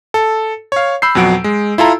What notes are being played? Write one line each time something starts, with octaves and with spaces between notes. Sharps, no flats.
A4
C#5 F5
B5 E6 G6 C7
F2 B2 F#3 F#5 D7
G#3
E4 F4 A4 A#5